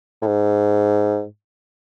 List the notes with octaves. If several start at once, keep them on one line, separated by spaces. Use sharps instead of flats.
A2
G#2